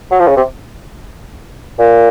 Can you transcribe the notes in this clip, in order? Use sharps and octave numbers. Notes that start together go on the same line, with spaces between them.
F#3
F3
C#3
C3
A#2